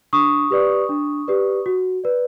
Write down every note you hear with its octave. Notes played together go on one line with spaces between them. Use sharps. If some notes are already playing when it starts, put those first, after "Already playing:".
D4 C#6 D#6
G4 B4 D5
D4
G4 B4 D5
F#4
B4 D5